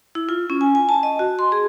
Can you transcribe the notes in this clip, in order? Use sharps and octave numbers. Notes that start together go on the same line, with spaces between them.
E4
F4
C#4
G#5
G#5
A5
D#5
F#4
C6
G#4